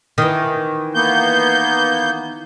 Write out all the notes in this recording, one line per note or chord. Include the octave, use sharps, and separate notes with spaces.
D#3 E3
A#3 B3 G6